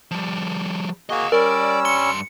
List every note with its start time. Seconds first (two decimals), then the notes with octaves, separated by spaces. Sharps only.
0.11 F3 G3
1.09 A#3 F#4 G#4 D#5 F5
1.32 G3 C#4 A#4 D5 E6
1.85 G2 C6 C#7